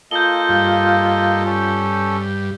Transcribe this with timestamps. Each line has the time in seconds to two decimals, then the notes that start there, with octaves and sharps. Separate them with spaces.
0.11 A#3 F4 A4 D#5 G6 G7
0.49 G2
1.45 C#4 A4